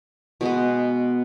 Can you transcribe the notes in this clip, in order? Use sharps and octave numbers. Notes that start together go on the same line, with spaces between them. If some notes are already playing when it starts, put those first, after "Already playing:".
B2 G#3 B3